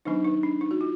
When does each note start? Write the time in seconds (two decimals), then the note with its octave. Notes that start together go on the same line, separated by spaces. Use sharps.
0.05 D#3 F#3 B3 D4 D#4
0.25 D#4
0.43 D4
0.61 D#4
0.71 F#4
0.81 F4